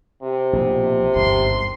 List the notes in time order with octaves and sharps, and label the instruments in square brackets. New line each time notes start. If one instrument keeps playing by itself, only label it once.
[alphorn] C3
[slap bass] A#1 B2
[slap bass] G1 D#2 G#2 [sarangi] C6